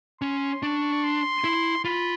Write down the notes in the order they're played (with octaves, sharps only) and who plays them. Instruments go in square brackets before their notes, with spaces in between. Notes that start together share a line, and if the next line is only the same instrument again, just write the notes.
[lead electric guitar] C#4 [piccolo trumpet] C6
[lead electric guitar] D4 [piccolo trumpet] C#6
[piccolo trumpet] C6
[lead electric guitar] E4
[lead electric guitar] F4 [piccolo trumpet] B5